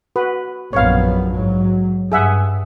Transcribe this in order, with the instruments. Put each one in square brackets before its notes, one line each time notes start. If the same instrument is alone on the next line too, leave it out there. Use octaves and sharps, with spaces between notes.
[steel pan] F#4 B4
[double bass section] A#1 F#2 B3 [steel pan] C#5 F5
[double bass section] G#2 F#3
[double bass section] G2 [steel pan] G#4 E5 F#5